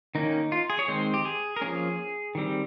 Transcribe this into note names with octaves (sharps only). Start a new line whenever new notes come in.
D#3 A#3 C#4 D#4
F4
G#4
C#5
D#3 G#3 C4 C5
G4
G#4
A#4
F3 A#3 C#4 G#4
D#3 G3 C4